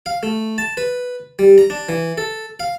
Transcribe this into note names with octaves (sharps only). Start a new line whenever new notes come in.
F5
A3
A5
B4
G3
A#5
D4
E3
A4
F5